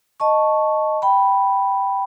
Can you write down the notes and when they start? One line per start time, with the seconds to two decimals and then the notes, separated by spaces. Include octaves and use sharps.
0.20 D#5 A5 C#6
1.02 G5 B5